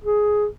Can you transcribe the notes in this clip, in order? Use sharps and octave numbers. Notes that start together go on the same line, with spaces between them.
G#4